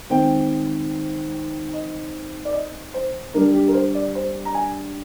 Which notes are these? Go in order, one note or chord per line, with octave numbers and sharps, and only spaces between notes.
D#3 G#3 C4 G5
D#5
D5
D#5
C5
D3 G3 D4 A#4
G4
A#4
C5
D5
C5
A#5
G#5